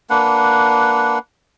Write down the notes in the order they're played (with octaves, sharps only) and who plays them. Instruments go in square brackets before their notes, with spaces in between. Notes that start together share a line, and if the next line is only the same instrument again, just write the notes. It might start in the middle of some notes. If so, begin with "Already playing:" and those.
[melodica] A#3 D4 B4 F#5